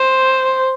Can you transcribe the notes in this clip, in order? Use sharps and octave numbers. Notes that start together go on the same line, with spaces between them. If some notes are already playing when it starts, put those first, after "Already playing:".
Already playing: C5